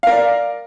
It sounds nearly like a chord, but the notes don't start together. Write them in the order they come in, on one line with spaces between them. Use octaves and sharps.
F5 A#4 D5